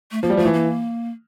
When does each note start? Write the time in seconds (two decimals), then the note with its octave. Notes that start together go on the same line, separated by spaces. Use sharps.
0.12 A3
0.23 F3 A#3
0.30 G3
0.37 F3 A3
0.45 E3
0.54 A#3